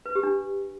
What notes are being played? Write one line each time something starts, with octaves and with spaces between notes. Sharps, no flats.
B4
G4
D4